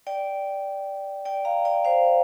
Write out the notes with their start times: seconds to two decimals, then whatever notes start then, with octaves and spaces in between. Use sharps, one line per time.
0.07 D5 G5
1.25 D5 G5
1.45 F5 A#5
1.65 D5 G5
1.85 C5 F5